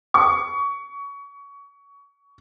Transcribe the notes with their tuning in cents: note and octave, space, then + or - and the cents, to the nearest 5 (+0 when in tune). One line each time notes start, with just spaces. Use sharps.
C#6 +25